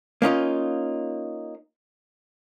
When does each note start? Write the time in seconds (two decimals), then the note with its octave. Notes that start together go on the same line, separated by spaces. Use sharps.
0.22 A#3 C#4 D#4 F4